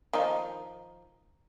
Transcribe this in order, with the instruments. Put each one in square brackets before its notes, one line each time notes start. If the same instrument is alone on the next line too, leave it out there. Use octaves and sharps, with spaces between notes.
[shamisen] D#3 F3 D#4